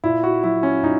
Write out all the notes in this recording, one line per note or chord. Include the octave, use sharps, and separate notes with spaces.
A#2 E4
F#4
F#3 E4
C#4
A#2 D#4